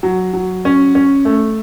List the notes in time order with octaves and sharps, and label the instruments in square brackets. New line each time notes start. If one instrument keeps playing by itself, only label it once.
[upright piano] F#3
F#3
C#4
C#4
A3